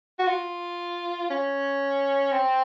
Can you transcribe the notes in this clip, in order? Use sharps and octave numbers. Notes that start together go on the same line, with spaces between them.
F#4
F4
C#4
C4